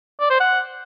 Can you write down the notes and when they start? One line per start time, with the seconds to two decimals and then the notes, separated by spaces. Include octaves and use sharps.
0.20 D5
0.30 C5
0.40 F#5